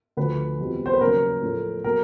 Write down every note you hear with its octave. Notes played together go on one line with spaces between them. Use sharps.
D2 D3 F3 B4
E2 B2 G3 C4 F4
C5
B4
D#2 C#3 F#3 A#3 A#4
A2 F3 A3
B2 F#3 A#3 A#4